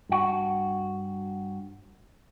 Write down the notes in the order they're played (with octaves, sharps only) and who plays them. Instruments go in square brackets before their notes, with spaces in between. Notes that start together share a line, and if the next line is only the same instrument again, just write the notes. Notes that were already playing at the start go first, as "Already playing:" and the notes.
[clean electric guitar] G2 F#4